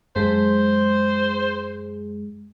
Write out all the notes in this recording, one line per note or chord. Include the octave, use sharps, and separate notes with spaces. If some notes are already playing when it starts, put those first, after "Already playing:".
F#2 G#3 G#4 C5